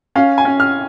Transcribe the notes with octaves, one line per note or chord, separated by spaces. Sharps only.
C#4 F5
G#5
C#4
F6